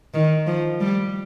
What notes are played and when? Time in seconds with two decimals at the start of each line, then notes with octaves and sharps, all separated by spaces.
0.14 D#3
0.47 F3
0.80 G3